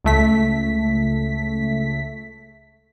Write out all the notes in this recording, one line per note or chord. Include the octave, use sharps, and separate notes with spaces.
C#2 A3 B6